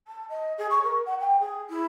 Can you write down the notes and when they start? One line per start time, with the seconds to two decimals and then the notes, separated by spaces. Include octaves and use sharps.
0.07 A5
0.29 D#5
0.57 G#4
0.70 C#6
0.83 A#4
1.06 F#5
1.20 G5
1.39 G#4
1.69 E4